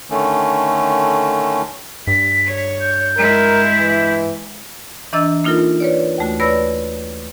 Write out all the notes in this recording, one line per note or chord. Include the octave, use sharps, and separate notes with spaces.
D3 D#3 A3 C#4
G2 B6
C#5
G6
G#3 E4 A#4
E3
E3 D4 D#5 A#5 E6 A6
A#3 D#4 F4 A4 A#4
B4 C#5 D5
D#2 A3 F#4
B4 C#5 D5 B5 E6 A#6